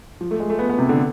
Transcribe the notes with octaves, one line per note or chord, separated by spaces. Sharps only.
F3
A3
G#3
A3
B3
B3
C3
D3